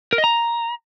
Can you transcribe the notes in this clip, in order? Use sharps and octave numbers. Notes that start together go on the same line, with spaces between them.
A#4
D#5
A#5